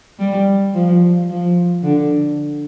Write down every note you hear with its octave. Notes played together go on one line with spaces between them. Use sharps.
G3
F3
F3
D3